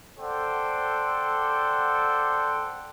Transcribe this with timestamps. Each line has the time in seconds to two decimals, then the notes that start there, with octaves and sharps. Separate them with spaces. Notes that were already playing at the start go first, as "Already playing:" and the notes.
0.19 A4 C5 D5 F#5 G5